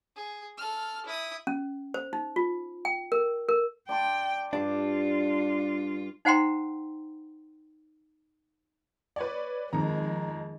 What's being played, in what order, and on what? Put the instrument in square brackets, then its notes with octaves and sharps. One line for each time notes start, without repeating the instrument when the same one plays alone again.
[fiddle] G#4
A4 F6
E4 D#6
[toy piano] C#4
C5
D#4
F4
G5
A#4
A#4
[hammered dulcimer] D5 A5 C6 [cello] G5
[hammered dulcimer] G2 D6 [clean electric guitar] D4 [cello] F4
[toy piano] D#4 C5 F#5 G5 A#5 C6
[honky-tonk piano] B4 C#5 D5
[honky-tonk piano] F2 A#5 [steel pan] D#3 C4 [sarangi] G#3